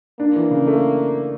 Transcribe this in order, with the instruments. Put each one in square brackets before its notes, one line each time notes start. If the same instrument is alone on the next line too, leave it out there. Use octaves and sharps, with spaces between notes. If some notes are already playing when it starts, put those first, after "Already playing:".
[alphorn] A#3 [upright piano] D4
[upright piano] E3
C#3
A3